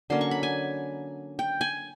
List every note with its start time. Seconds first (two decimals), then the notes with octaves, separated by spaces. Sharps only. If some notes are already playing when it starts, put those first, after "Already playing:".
0.10 D3 F#3 A#3 C#4 C6
0.21 C#6
0.31 B5
0.43 G#5
1.39 G5
1.61 G#5